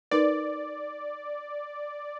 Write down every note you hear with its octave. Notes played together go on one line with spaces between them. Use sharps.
D#4 A#4 B4 D5